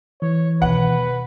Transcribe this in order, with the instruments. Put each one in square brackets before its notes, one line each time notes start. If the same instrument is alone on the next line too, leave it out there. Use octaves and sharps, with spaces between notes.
[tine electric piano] E3 [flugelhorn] C#5
[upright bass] D#2 B2 [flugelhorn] B4 [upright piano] F#5